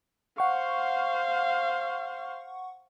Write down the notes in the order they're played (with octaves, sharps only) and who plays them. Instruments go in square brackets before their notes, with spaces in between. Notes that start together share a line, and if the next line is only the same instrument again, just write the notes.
[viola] C5 F5 [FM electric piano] F#5 C#6